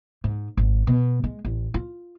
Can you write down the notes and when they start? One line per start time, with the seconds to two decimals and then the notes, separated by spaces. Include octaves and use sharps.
0.24 G#2
0.57 G#1
0.87 B2
1.24 G#3
1.45 A1
1.74 F4